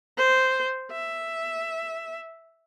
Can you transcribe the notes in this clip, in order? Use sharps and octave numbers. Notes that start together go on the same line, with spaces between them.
C5
E5